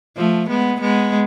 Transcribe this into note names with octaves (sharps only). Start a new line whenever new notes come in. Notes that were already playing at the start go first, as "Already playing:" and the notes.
F3 A3
G#3 B3
G#3 B3